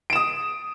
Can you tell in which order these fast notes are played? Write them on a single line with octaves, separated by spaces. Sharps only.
D7 E7 D#6